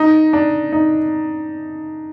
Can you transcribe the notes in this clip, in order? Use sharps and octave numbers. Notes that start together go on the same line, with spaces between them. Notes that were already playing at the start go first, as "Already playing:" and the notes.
Already playing: D#4
D4
D#4